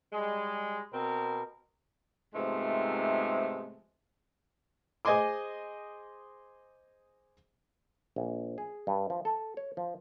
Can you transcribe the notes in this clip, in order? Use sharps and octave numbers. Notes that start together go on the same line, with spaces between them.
G3 G#3
B2 C4 A#4
G#2 C3 F3 G#3 A3 B3
G#4 C5 D#5 G#5 C6 D6
A#1
G#4
G2
F3
A4
C#5
F3